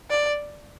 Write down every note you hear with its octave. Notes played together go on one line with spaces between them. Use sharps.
D5